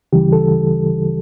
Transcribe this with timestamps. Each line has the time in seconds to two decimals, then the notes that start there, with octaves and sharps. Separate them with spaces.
0.13 D2 C#3 E3 G3 G4
0.33 A4